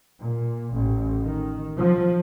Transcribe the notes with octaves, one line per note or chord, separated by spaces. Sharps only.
A#2
A1
D#3
F3